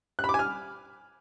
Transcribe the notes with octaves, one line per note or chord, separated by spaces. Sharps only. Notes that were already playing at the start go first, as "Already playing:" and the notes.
F#6
B5
D6
G#5
F6